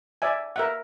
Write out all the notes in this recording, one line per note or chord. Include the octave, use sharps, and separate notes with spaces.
D5 E5 G#5
A#4 E5 F#5